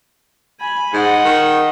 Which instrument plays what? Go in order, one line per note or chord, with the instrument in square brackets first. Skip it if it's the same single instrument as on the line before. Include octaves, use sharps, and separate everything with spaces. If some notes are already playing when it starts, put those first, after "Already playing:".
[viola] G#5 B5
[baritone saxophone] G#2 [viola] D#5 F#5
[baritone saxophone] D#3